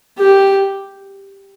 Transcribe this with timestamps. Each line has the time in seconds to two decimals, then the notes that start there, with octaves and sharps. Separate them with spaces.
0.18 G4